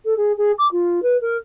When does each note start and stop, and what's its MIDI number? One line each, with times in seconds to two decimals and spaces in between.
0.05 0.14 69
0.17 0.32 68
0.37 0.51 68
0.58 0.67 86
0.71 1.00 65
1.02 1.16 71
1.21 1.37 70